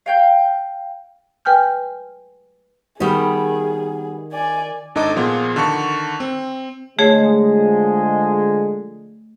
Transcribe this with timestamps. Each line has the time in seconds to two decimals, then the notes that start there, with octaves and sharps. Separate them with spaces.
0.06 F5 G5 G6
1.45 B4 G5 G#5 F6 G6
3.00 D#3 G3 B3 G#4
4.32 D5 G#5
4.95 G#1 D4 D#4 A4 D#5 D6
5.16 A#2 F3 B3 F4 G#4
5.56 D3 D#3 A5 C#6
6.20 C4
6.99 D3 F3 G#3 A3 G#4 C#5